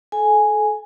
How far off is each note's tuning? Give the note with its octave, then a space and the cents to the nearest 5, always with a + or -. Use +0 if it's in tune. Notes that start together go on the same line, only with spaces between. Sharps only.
A4 -30 G#5 +0